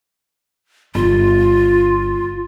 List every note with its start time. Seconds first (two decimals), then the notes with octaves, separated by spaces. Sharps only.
0.95 G1 F4